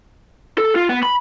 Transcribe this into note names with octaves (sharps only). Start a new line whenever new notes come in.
A4
F4
B3
B5